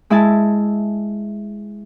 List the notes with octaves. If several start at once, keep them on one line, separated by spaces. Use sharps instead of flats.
G#3 E4 E5 G#5 A5